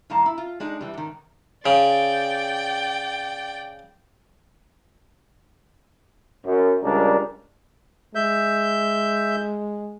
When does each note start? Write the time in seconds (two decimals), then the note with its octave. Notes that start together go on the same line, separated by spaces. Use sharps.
0.10 A2 D#3 G3 F5 A5 A#5
0.26 E4
0.38 F4
0.60 G#3 D4 D#4
0.81 E3 G3
0.94 G#2 D#3
1.66 C#3 D5 G5
6.46 F#2
6.82 C#2 G3 D4 A#4
8.15 G#3 E5 G6